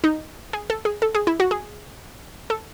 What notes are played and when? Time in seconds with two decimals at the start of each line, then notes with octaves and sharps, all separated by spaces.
0.04 D#4
0.53 G#4
0.70 A4
0.85 G#4
1.02 A4
1.15 G#4
1.27 E4
1.40 F#4
1.51 G#4
2.50 A4